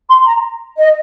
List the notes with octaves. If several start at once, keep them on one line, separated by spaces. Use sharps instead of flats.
C6
A#5
D#5